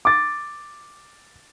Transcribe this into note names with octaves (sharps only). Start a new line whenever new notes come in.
D6 A6